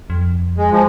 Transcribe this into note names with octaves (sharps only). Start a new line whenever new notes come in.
F2
G#3
F3 G#3